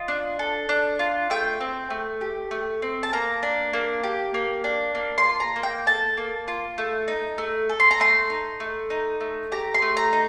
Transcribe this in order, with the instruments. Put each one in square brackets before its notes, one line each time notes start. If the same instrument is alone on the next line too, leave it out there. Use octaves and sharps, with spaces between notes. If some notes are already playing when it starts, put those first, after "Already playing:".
Already playing: [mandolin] F4 D#5
D4
A4
D4
F4
A3 G5
C4
A3
G4
A3
C4
A5
A#3 A#5
D4
A#3
G4
A#3
D4
A#3
C6
F4
A#5
A#3
G5
A4 A5
A#3
F4
A3
D#4
A3
A4
C6
A#5
A3 C6
D#4
A3
D#4
A3
G4 A#5
C6
A3
A#5
D#4